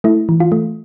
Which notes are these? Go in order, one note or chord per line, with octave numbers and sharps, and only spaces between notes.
A3 E4
E3
F4
A3